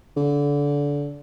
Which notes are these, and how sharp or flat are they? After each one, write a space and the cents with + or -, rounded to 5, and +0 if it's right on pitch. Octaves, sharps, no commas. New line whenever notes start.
D3 -25